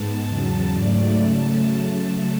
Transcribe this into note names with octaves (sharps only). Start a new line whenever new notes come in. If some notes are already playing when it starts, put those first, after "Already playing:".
Already playing: G#2 G#3 B3 A5
E2 C#3 F#3
G#2 F#3 A3 D5
C#3 F#3 A3 A5